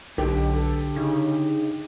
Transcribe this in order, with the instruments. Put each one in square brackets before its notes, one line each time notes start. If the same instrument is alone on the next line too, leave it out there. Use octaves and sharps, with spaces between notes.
[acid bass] B1 [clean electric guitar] D3 [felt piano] G4
[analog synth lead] A4
[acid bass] C#3 [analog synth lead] D#4